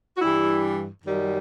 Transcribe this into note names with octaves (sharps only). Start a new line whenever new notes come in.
F#4
G2 E3 G3 E4
F#2 D#3 G3